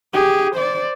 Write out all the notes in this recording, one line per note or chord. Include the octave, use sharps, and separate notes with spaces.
G4 G#4
C5 D5